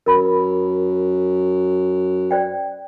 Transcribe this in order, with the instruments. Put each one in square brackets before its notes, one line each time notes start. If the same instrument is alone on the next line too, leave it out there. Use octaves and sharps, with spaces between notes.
[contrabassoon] F#2 [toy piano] A#4 B5
[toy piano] C5 D5 G5